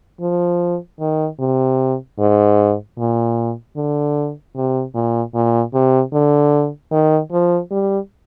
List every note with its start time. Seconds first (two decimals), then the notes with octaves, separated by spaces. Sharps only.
0.21 F3
1.00 D#3
1.40 C3
2.19 G#2
2.98 A#2
3.76 D3
4.56 C3
4.95 A#2
5.34 A#2
5.74 C3
6.13 D3
6.92 D#3
7.32 F3
7.71 G3